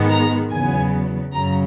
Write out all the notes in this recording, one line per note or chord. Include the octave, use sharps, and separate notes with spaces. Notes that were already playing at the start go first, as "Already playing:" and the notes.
Already playing: G#2 D#3 G#3 B3
A#5
E2 C#3 F#3 B3 G#5
F#2 C#3 F#3 A#5